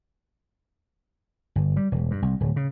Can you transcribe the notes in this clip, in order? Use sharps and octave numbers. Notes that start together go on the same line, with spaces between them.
G1
G3
E1
G2
C2
D1
C#3